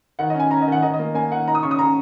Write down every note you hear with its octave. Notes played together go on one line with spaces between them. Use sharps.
D#3 F#5
D#5
C#4
G#5
C#4 A#5
D#5
D#3 F#5
D#3 D#5
D#5
A#3
A#3 G#5
D#3 F#5
D#4 A#5
D#6
C#3 C#6
D#6
C#3 A#5